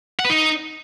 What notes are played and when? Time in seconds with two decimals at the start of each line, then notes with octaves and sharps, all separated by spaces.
0.20 F#5
0.25 B4
0.30 D#4